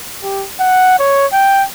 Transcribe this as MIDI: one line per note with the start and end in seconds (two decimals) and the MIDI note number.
0.23 0.45 67
0.60 0.99 78
0.99 1.26 73
1.33 1.63 79